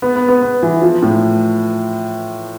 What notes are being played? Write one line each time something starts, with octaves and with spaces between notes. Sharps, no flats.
B3
B3
B3
B3
E3
F3
A2